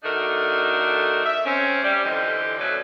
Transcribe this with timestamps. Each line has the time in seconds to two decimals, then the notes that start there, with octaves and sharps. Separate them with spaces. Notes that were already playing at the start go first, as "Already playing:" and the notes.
0.04 D3 A3 D4 D#4 F#4 A#4
1.25 E5
1.45 C4 C#4
1.83 G3
2.05 F2 D3 E3 F4 G4 D#5
2.59 B2 F#3 A3 C#4 B4 D5